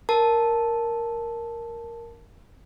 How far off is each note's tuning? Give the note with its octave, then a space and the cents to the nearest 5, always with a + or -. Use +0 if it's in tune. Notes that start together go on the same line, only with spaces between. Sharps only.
A#4 +0 A5 -5